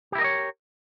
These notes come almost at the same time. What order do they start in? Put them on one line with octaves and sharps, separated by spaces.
G4 E4 A#4 D#5 C#5